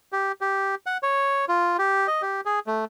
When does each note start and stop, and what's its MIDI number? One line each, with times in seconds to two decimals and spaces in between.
0.12 0.32 67
0.41 0.75 67
0.86 0.98 78
1.03 1.45 73
1.48 1.77 65
1.79 2.07 67
2.07 2.22 75
2.22 2.41 67
2.45 2.59 68
2.67 2.85 57